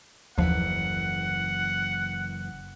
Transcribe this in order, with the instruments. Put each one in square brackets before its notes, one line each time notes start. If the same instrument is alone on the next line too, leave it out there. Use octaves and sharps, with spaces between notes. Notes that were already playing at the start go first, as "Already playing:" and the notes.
[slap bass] F#1 E3 [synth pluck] D#2 F3 [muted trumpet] F#5